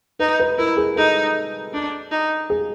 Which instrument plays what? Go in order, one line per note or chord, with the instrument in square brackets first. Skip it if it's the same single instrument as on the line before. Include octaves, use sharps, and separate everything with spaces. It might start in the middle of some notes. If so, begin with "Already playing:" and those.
[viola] D#4 [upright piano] B4
[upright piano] B4
[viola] E4 [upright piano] A#4
[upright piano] G#4
[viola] D#4 [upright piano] A4
[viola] D4
D#4
[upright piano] G#4